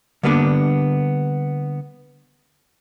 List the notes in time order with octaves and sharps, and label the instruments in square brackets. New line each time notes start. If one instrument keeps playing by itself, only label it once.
[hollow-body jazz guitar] D3 G3 A#3 B3 C#4 D4